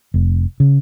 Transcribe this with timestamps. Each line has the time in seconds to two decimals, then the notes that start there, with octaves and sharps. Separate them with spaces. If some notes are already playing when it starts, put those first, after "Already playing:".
0.14 F1
0.60 C#3